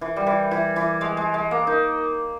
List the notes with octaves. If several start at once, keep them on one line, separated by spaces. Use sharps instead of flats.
E3
G3
E3
E3
E3
G#3
G#3
G#3
A#3
D#4